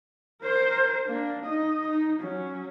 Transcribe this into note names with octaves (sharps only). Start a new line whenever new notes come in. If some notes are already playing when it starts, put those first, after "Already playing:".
A#4 C5
A#3 D4
D#4 D#5
D#4
F#3 C#4